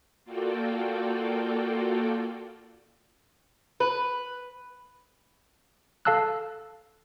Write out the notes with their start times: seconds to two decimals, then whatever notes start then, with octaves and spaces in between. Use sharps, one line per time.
0.24 A#3 F4 F#4 A4 D5 G5
3.80 B4
6.05 A4 F5 A5 E6 F#6